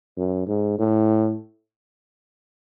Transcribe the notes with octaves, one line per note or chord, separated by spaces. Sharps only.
F#2
G#2
A2